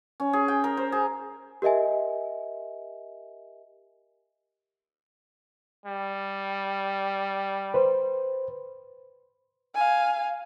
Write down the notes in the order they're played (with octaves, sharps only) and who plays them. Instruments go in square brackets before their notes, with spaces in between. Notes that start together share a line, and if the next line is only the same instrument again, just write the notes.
[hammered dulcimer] C#4
G#4
G5
A#4
C5
G#4
[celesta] G4 A#4 D#5 E5 G#5
[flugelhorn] G3
[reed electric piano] B4 C5
[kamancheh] F5 G#5